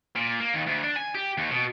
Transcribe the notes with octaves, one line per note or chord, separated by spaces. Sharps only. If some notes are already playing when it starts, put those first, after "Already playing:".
A#2
A#3
D#2
D2
D4
G#5
G4
D#2
B2